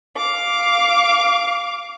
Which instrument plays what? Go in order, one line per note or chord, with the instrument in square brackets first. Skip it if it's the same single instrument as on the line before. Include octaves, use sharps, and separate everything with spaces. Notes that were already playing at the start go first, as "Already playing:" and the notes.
[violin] F5 D6